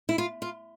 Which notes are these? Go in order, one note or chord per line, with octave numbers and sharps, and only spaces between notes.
E4
F4
F4